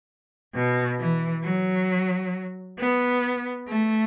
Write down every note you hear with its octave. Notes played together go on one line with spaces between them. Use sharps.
B2
E3
F#3
B3
A3